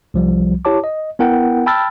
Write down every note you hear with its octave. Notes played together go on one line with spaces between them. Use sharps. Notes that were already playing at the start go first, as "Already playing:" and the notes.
C2 F3 G3
E4 G4 C#5 A5 D6
D#5
B3 E4 A#4 F#5 G5
G5 A5 B5 E6 F6 A6